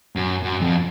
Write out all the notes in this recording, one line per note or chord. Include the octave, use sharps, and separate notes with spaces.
F#2
F#2
F2